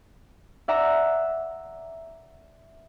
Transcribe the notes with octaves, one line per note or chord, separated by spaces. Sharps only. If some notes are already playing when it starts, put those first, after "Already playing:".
D5 E5 F#5 A#5 D6